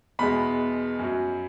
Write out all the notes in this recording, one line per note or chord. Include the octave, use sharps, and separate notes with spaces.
E2 B2 G#3 B5
F#2 F#3